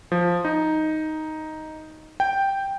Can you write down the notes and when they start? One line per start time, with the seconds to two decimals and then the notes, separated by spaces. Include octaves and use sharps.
0.12 F3
0.45 D#4
2.20 G5